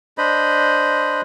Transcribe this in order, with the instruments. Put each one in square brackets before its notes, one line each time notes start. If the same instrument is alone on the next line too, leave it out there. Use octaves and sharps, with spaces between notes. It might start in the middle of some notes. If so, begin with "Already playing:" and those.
[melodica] D4 C5 D#5 B5